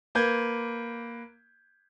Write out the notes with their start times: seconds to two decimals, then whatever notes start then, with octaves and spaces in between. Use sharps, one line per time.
0.15 A#3 B4 G6 G#6